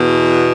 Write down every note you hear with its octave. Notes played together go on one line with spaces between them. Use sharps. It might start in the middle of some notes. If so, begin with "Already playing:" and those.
Already playing: E2 B2